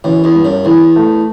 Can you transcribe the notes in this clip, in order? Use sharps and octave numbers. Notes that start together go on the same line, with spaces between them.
F#2 E3
E2
G2
F#2
E2 E3
A3